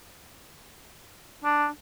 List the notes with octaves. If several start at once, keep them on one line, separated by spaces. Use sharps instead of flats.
D4